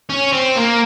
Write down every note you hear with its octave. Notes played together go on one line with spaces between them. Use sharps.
C#4
C4
A#3